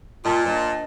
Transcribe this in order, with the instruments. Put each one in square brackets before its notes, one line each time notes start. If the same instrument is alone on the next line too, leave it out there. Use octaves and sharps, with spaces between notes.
[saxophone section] A#2 [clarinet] F4 [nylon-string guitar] D#5 A5
[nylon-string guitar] D4 C5 [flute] D#5 [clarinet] A5